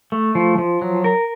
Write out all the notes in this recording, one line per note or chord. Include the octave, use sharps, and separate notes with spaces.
A3
F3
F3
F#3
A#4